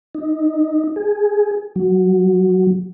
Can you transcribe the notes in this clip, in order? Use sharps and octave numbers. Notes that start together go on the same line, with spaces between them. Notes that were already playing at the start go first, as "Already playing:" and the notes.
D#4
G#4
F#3